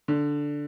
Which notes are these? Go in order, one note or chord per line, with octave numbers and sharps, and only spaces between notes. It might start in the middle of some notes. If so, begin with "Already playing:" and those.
D3